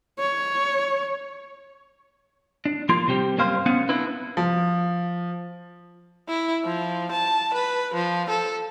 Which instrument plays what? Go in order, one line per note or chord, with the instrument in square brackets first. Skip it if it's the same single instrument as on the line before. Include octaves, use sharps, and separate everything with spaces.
[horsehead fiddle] C#5
[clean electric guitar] D4
F3 A#3 F4 A#4 C6
C3 G3 C4 G4
F#2 G3 A#3 C5 F5 C6
B3 C#4 F5 F#5
B3 C4 D4 E4 B4
[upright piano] F3
[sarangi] E4
F3
A5
B4
F3
A4